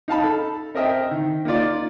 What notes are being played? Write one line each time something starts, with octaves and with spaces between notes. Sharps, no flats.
D#4 F5 A5 B5
A4
C4 A#4 D#5 E5 G5
D#3
A#3 D#4 F4 D5